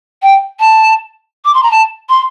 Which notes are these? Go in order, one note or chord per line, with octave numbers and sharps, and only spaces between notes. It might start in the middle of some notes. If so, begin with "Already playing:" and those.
G5
A5
D6
C6
A#5
A5
C6